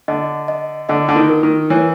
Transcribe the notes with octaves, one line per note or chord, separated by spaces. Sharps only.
D3 D#5
D#5
D3 D#5
D3
D#3
A#4
D#3
E3 C#5